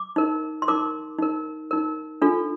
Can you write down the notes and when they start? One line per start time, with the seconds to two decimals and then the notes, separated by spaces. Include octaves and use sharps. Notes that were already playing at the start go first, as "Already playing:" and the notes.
Already playing: D6
0.16 D#4 A#4
0.62 C6
0.68 D#4 A#4 D6
1.19 D#4 A#4
1.71 D#4 A#4
2.22 D4 F4 A4